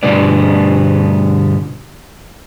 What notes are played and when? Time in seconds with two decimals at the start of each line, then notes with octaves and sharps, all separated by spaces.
0.03 G2 B2 D3 G3 B3 D5